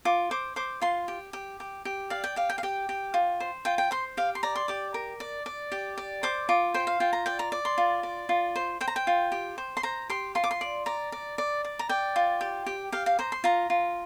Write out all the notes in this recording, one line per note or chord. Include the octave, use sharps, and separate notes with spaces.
F4 D6
C5 D6
C5 D6
F4 C6
G4
G4
G4
G4
D5 F5
G5
G4 F5
G5
F5
G4 G5
G4
F4
C5
F4 G5
G5
C5 C6
G4 F5
C6
D5 A#5
C6
G4 D6
A#4
D5
D5
G4
D5
C5 D6
F4 D6
C5 G5
F5
F4 G5
A#5
D5 G5
A#5
D5
C6
F4
D5
F4
C5
C5 G5
A#5
G5
F4
G4
C5
C6
C5 A#5
G4 C6
F4 C6
D6
C6
D5
D5 A#5
D5
D5
D5
A#5
D5 G5
F4
G4
G4
G4 F5
F5
C5 A#5
C6
F4 A#5
F4